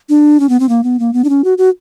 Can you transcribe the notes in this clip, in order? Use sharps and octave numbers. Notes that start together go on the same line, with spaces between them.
D4
C#4
B3
C4
A#3
B3
A#3
B3
D4
C#4
F#4
F#4